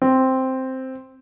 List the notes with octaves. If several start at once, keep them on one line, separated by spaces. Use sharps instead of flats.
C4